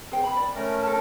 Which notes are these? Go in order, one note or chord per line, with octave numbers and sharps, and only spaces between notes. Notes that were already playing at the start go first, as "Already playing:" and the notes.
G#4 C5 G5
B5
D5
A3 C#4 A#4
A4 A5